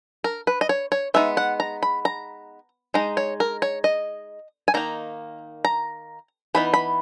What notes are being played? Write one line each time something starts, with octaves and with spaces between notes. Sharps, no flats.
A#4
B4
D#5
C#5
C#5
G#3 B3 D#4 E5
F#5
A#5
B5
A#5
G#3 D#4 A#5
C#5
A#4
C#5
D#5
G#5
D#3 A#3 D#4 A#5
A#5
E3 B3 D#4 B5
B5